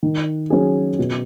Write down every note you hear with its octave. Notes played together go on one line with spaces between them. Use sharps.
D#3
F#3 C#4 G#4
B2